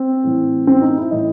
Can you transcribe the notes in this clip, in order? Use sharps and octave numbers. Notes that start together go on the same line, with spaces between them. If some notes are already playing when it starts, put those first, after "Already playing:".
Already playing: C4
A2 E3
C4
D#4
E4
A2 E3 D#5